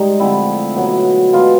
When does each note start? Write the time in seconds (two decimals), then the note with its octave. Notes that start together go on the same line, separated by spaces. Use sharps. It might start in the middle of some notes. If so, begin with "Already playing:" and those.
Already playing: G#2 G3 D#4
0.20 D3 F3 A3 C4 E4
0.76 B2 F#3 B3
1.33 B2 G#3 B3 D4 F4